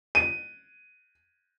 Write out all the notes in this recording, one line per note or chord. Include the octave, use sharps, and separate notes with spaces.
D#7